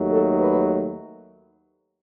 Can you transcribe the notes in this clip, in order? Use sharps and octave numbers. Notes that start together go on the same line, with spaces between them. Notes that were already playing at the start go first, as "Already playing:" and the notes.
Already playing: D#2 D#3 F#3 A3
A4
B4